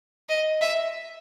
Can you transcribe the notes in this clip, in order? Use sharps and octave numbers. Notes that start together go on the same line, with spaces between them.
D#5
E5